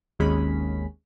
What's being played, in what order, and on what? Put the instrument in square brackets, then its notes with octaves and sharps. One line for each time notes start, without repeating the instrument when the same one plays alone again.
[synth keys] G#1 D#2 G#3 C#4 B5